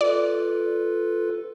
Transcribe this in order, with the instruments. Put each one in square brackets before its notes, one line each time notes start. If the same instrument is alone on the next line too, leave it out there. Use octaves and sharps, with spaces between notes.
[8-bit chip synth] F4 A4 B4 [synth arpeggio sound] D5